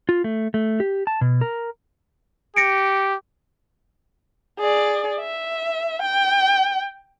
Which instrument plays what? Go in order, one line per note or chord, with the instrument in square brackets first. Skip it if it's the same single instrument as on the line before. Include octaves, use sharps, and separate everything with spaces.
[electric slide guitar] F4
A3
A3
G4
A5
B2
A#4
[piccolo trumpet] G4 [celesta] A#6 C#7 D7
[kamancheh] G#4 D5
E5
G5